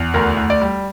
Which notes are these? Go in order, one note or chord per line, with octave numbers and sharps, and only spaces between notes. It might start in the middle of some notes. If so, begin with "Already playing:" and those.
Already playing: E2
D2 A#4
D2
D5
G3